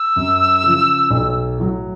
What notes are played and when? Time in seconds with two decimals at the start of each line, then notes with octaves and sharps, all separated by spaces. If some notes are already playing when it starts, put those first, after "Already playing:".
Already playing: E6
0.16 F#2
0.64 C#3 F3
1.10 B1
1.58 A2 F#3